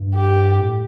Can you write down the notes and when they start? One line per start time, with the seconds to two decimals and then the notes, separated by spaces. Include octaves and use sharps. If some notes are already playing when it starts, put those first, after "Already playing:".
Already playing: G2
0.15 G4
0.59 A2